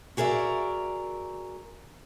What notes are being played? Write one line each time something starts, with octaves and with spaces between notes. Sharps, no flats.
F#4 G#4 A#4 D5 E5